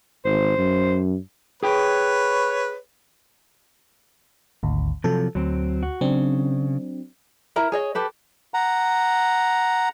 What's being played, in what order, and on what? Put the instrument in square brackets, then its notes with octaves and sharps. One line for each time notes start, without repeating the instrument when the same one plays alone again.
[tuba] G#1 [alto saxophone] C5
[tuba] F#2
[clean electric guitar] G#4 G5 [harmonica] B4 C#5
[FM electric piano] G#1 D2
[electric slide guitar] C3 F3 F#3 [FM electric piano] A4
[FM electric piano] D2 [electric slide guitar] F#3 C4
[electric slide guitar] F#4
[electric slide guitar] C#3 [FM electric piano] F#3 C4 D4
[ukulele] E4 A#4 A#5
G#4 C#5 D#5
G4 A4 B4
[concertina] F#5 A#5